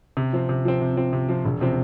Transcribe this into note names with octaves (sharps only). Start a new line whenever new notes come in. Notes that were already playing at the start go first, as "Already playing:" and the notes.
C3
F3 C4
C3
F3 C4
C3
F3 C4
C3
F3 C4
E1
C3 F3 C4